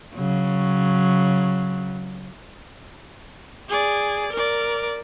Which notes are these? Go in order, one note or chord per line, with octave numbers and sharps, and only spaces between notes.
C#3 F#3
G#4 D5
A#4 D5